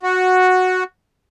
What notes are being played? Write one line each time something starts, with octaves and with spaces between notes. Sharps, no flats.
F#4